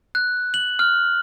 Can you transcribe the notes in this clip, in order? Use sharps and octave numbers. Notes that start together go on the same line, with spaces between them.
F#6
F#7
F6